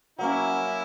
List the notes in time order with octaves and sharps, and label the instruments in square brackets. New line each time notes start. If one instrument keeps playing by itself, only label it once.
[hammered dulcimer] F#3 A#3 C#4 [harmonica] E4